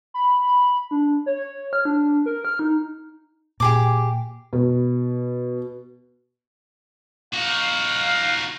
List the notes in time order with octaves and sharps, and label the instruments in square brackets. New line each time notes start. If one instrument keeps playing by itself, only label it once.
[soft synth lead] B5
D4
C#5
F6
D4
A#4
F6
D#4
[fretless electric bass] A#2 [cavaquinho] G4 G#4 D6
[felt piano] B2
[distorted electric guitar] D#4 F#4 [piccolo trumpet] F5